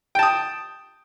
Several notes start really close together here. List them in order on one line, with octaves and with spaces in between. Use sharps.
G5 A5 D#6